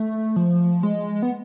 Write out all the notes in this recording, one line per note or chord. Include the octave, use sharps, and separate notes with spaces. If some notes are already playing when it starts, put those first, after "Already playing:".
Already playing: A3
F3
G#3
B3